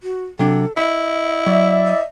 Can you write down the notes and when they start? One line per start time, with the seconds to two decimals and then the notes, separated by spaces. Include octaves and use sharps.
0.03 F#4
0.39 C3 F#3 D4 A4
0.77 E4 D#5 B5
1.46 F#3 D5 E5
1.84 D#5